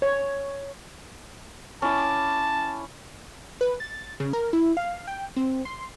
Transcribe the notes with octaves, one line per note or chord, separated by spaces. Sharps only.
C#5
C#4 E4 A5 D6
B4
A6
C#3
A#4
E4
F5
G5
C4
C6